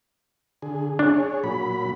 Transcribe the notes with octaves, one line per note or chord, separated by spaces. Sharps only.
D3 G#4
D4 G#4 C#5
A#2 F#3 B5